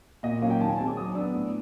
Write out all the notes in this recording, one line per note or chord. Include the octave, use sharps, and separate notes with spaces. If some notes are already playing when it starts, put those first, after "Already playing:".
A#2 D#5
F#3 A#3 C#4 F5
G5
D#3 A5
G#5
G#3 C4 A5
D6
F#3 D#6
B3 D4 E6
A2